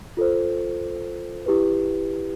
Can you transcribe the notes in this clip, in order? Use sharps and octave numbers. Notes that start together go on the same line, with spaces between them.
F4 A4 C5
E4 G4 B4